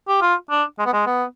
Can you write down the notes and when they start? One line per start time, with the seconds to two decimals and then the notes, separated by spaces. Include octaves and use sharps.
0.08 G4
0.22 F4
0.50 D4
0.79 G#3
0.86 B3
0.93 G#3
1.07 B3